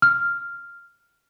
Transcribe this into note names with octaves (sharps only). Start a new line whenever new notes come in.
F6